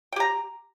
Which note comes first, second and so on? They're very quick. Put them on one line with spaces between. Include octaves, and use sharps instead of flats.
G5 G4 A#5